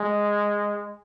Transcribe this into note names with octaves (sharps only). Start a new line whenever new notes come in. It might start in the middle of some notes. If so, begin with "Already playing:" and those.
Already playing: G#3